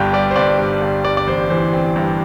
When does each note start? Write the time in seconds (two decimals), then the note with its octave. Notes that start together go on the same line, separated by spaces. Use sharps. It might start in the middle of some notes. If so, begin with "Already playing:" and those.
Already playing: G1 G2 G5 A5
0.13 G3 D5
0.31 C5
0.36 G1 D5
0.59 G2
0.81 G1
1.05 G2 D5
1.17 D5
1.27 A1 C5
1.50 E3 C5
1.73 C4
1.96 G2